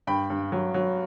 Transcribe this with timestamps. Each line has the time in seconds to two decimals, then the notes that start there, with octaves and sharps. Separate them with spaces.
0.07 G2 G5 B5
0.30 G2
0.52 F#3
0.74 F#3